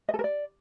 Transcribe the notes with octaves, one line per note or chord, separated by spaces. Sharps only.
D#5
A4
A#4
D5